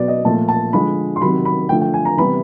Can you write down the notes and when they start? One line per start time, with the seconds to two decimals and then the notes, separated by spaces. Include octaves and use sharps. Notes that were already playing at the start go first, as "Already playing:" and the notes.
Already playing: B2 F#3 B3 D5
0.08 D#5
0.25 A#2 F3 A3 A5
0.49 A5
0.73 D3 F3 G#3 B5
1.16 C6
1.21 C3 D#3 F#3 B5
1.45 B5
1.69 D3 F3 A3 G5
1.81 G5
1.94 G#5
2.05 A#5
2.18 C3 E3 G3 B3 B5